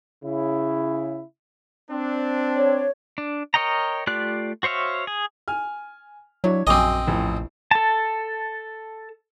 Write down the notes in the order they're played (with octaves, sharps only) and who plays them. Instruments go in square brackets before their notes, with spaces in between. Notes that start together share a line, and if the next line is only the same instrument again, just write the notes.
[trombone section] C#3 E4
[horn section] C4 D4
[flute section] C#5
[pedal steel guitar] D4
A#4 C#5 D#5 G5 A#5
A3 F4 G4 D5 F#6
F#4 C5 C#5 E5 F5
G#4
[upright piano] G#5 F6
[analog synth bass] F#3 [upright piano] D4 E4 C#5
[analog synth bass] A#1 [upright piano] F#2 G#5 D6 [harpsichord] C4 D#5
[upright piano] A1 F2
[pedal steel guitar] A4 A5